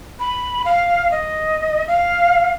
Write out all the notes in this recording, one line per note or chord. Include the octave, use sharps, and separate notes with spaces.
B5
F5
D#5
F5